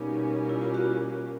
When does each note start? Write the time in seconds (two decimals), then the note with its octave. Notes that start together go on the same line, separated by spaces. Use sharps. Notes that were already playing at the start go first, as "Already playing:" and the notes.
Already playing: B2 G3 A#3 C#4 D#4
0.49 E4
0.61 F4
0.74 F#4